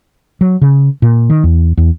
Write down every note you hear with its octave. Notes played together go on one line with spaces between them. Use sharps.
F#3
C#3
A#2
D#3
E2
E2